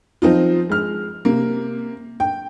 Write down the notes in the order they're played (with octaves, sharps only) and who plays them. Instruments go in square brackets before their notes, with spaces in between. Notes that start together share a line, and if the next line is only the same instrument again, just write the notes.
[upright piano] F3 C4 D#4 F4
G#3 F6
C3 A#3
G5